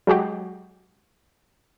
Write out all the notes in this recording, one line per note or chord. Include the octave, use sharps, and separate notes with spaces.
F#3 G#3 F#4 G4